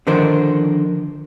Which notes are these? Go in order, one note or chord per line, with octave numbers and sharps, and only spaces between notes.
D3 D#3 F3 D4 A#4 C5